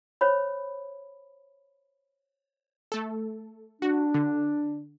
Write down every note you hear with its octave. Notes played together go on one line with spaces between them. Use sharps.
C5 C#5 B5
A3 A4
D4 F#4
D3